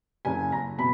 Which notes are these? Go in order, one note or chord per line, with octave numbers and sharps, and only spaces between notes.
F#1 G#5
F#1 A#5
B2 B5